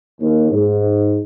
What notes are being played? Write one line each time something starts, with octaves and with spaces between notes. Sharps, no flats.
D#2
G#2